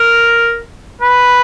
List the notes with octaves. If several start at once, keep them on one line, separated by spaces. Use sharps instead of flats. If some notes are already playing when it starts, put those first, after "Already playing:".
Already playing: A#4
B4